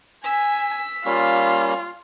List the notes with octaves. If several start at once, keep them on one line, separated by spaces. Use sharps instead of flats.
G#5 E6 B6
G3 A#3 C#4 F4